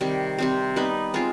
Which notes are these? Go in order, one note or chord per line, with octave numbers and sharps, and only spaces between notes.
C3 D#3 G3
C3 G3 C4
G3 B3 D#4 B4
G#3 C4 F4